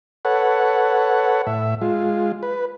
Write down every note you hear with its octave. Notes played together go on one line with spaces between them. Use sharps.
A4 B4 C#5 F#5
A2 E5
G#3 F4
B4